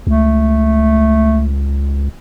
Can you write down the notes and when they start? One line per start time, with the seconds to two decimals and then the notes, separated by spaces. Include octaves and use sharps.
0.07 C#2 A3